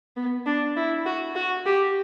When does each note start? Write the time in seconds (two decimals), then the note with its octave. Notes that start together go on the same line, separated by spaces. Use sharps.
0.16 B3
0.46 D4
0.76 E4
1.05 F#4
1.35 F#4
1.66 G4